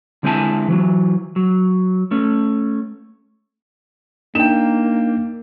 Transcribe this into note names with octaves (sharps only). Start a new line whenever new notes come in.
D3 G#3 C4 E4 G#5 A5
E3 F#3
F#3
A3 C#4
A#3 D4 D#4 G5 E7